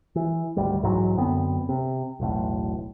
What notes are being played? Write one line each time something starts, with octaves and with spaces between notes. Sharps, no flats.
E3
G#1 D2 G3
B1 G#2 E3 F#3
F#2 D3 B3 C4
C3
E1 B1 A2